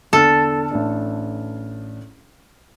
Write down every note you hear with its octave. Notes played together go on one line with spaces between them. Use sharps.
E2 D3 A4 F6
A1 D4